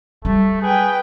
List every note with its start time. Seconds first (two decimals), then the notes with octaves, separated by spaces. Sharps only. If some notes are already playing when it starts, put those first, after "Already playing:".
0.25 F#3 G3 A3
0.62 G#4 B4 G5